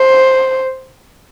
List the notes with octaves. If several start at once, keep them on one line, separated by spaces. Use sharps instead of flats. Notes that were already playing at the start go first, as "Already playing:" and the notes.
Already playing: C5